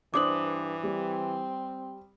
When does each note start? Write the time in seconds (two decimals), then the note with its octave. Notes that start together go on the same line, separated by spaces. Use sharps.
0.14 G2 E3 D4 C5 D6 D#6 F#7
0.83 G3 C4